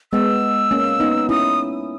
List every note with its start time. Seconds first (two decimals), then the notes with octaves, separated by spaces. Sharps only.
0.12 G#3 B3 E6
0.71 A#3 C#4
1.00 B3 D#4
1.29 C#4 E4 D#6